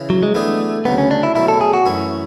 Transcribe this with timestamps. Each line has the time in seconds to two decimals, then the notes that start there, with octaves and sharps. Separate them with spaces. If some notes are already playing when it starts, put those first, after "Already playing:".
Already playing: C#3 E3
0.10 F#3
0.23 G#3
0.35 E3 A3 B3 D4 G#4
0.85 D2 C#3 F#3 B3
0.98 C#4
1.11 D4
1.23 E4
1.35 B2 F#3 A3 E4
1.48 A4
1.61 G#4
1.74 F#4
1.86 F#2 E3 A3 E4